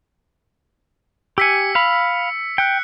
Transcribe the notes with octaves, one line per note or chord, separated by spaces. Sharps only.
G4 G#5 E6 B6 C#7
F5 B5
G5 F#6 C#7